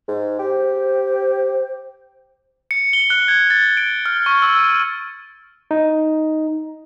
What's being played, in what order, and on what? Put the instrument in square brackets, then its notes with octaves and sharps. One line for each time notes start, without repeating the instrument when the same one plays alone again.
[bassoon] G#2
[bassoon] G4 [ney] C5
[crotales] C#7
G7
F#6
G#6
A6
D7
F6
C#6
E6
D#7
[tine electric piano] D#4